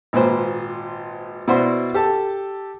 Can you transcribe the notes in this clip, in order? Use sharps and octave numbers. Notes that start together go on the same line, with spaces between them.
G#1 A#2 B4 C5
B2 E4 F#4 C5 D5 C6
G4 A4 A5